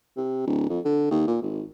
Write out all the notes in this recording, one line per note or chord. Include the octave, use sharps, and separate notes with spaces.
C3
D1
F2
D3
D#2
A#2
G#1